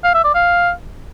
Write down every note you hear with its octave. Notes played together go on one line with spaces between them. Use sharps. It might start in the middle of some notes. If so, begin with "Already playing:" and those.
F5
E5
D5
F5